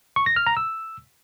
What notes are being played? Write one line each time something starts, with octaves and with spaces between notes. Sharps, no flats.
C#6
A#6
F6
A#5
E6